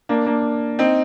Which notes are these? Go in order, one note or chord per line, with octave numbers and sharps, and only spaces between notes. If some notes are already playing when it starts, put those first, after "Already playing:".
A#3 D4
A#3 D4
C4 D#4